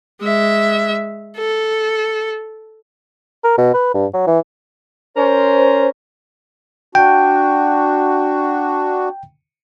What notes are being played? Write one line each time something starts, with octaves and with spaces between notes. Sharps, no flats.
G#3 E5
A4
A#4
B2
B4
G2
F#3
E3
C#4 A#4 C5
D4 F#4 G5